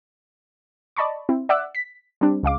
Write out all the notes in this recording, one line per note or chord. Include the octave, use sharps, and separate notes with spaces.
D5 D#5 A5 B5 C#6
C4 E4
D5 E5 F#5 D6 E6 F#6
B6
G3 C4 D4
C#2 G#3 F5 D6